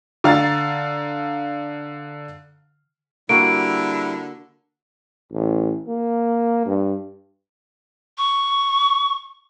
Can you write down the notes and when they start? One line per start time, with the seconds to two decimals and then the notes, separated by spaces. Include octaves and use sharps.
0.24 D3 F5 A#5 A6
3.29 D3 G3 A#3 E4 F#4 D7
5.32 A1
5.88 A#3
6.66 G2
8.18 C#6